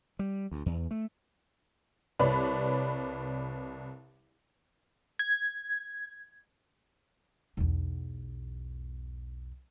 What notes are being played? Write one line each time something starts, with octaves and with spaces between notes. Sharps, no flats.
G3
D2
E2
A3
C2 B4 C#5 D5 B5
G#6
B1 E2